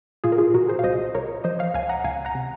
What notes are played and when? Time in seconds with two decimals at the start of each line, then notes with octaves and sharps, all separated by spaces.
0.24 A#2 F4 G#4
0.32 A#4
0.38 F4 G#4
0.54 A#2 F#4 A#4
0.68 G#4 C5
0.79 F5
0.84 C2 C5 D#5
1.15 C2 A#4 C#5
1.44 F3 C5 D#5
1.59 C#5 F5
1.74 C#2 F5 G#5
1.89 F#5 A#5
2.04 C#2 F5 G#5
2.25 F#5 A#5
2.35 C3